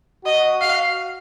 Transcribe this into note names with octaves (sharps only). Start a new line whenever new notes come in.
F#4 D#5
F5